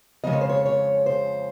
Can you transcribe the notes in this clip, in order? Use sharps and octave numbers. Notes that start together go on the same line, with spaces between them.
F2 C#3 F3 G#3 D#5
C#5
C5
C#5
C#5
C5